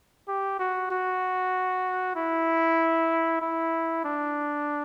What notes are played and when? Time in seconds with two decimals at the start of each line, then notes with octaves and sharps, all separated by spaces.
0.28 G4
0.60 F#4
0.91 F#4
2.16 E4
3.42 E4
4.04 D4